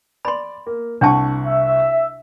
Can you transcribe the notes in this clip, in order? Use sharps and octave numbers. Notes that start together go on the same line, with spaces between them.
D5 B5 C6
A#3
C2 D4 F#5 A5 C#6
E5